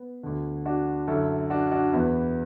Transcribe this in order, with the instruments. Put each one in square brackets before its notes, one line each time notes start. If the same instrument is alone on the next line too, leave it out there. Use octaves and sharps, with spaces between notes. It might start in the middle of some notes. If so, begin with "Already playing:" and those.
Already playing: [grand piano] B3
D2 D3
D4 F#4
F#2 D3 E4 A4
D4 F#4
D4 F#4
E2 E3 B3